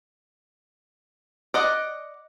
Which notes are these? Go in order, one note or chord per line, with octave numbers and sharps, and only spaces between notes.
D5 D#5 F#5